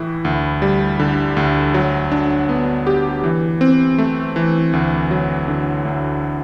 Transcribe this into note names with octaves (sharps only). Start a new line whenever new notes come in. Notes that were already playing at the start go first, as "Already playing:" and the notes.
Already playing: A2 E3 E4
D2
G3
D3
D2
F#3
D4
B3
G4
E3
C4
A3
E3
D2
F#3
D3
D2